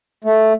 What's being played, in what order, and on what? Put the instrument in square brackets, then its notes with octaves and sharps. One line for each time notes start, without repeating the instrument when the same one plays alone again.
[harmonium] A3